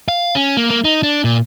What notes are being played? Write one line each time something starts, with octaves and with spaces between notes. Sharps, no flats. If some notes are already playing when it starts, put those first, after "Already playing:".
F5
C#4
A#3
A#3
D#4
D4
A#2